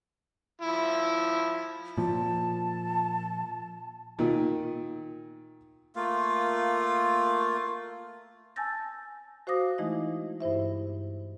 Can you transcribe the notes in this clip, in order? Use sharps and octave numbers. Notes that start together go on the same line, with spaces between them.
F3 E4
A#2 F3 A5
A#2 D#3
A3 A#3 F4 F5
G#5 A5 E6 G6 A6 A#6
F#4 C5 F5 D6 D#6 A#6
E3 G#3 A3 D#4 E4 D#5
G2 E4 C5 E5